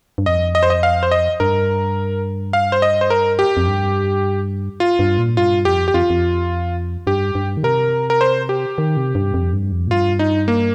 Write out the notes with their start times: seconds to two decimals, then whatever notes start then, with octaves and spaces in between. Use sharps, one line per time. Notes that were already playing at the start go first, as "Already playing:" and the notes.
0.18 G2
0.26 F2 D#5
0.55 D#5
0.63 C5
0.70 D#5
0.83 F5
1.03 C5
1.11 D#5
1.40 G2 A#4
2.53 F5
2.72 C5
2.82 D#5
3.01 C5
3.10 A#4
3.39 G4
3.57 F2
3.67 G2
4.80 F4
4.99 G2
5.18 A#2
5.37 G2 F4
5.65 F2 G4
5.88 G4
5.94 F2 F4
6.10 F2
7.07 G2 G4
7.35 G2
7.57 D#3
7.63 C3 A#4
8.10 A#4
8.21 C5
8.49 G4
8.78 D#3
8.97 C3
9.15 G2
9.34 F2
9.53 G2
9.72 F2
9.87 A#2
9.91 G2 F4
10.19 D#4
10.48 A#3